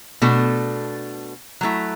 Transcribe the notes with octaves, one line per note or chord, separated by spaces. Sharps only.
B2 A3 D4 A4
F#3 A3 E4